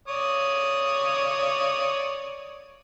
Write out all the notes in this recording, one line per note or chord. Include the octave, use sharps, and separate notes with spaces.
C#5 D5 D#6